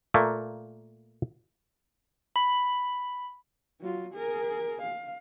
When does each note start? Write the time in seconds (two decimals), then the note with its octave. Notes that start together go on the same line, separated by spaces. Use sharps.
0.14 A#2 A3 A#3
2.36 B5
3.80 F#3 F4
4.14 G#4 A#4
4.82 F5